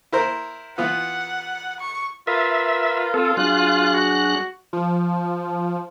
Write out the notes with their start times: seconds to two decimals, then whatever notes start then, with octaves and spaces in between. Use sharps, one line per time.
0.12 E4 A#4 C5
0.78 E3 B3 F4 F#5
1.80 C#6
2.27 F4 A#4 B4 E5
3.14 C4 A4
3.37 F#3 D4 G#4 F#6
3.94 F#4
4.73 F3